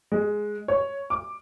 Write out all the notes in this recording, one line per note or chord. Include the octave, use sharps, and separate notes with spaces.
G#3
C#5
D6